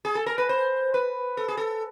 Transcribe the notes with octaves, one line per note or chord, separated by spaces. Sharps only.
G#4
A4
A#4
B4
C5
B4
A4
G#4
A4